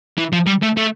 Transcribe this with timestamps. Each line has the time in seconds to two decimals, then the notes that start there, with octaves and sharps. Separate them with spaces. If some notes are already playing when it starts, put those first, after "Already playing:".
0.18 E3
0.33 F3
0.47 G3
0.63 A3
0.77 A3